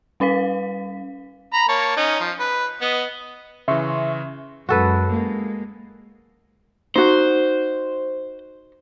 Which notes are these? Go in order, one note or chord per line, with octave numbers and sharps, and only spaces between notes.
G3 C#4 B4 F5 B6
A#5 B5
A#3 C#5 A5
C#4 D#4
F3
B4
B3 D#5
C#3 E3 E5 C6 C#6
F#2 G#3 F#4 A4 B4
G#3 A#3
D#4 F#4 C5